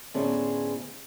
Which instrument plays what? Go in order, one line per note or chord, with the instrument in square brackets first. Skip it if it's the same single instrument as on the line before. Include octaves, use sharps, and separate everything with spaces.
[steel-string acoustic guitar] A2 D3 B3 C#4 G#4 C5